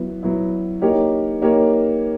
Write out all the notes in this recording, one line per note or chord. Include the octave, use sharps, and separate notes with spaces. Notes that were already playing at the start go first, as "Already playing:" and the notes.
Already playing: F#3 B3 E4
F#3 B3 E4
A#3 D#4 G4 A#4 C#5
A#3 D#4 G4 A#4 C#5